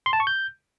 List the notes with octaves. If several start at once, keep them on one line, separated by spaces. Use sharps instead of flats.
C6
A5
C#6
G6